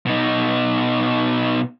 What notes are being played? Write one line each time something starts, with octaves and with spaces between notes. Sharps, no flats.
B2 D#4